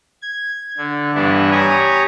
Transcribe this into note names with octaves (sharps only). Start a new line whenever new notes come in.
G#6
D3
G2 E3 B3 D4 E4
G4 C#5 G#5 A#5 D#6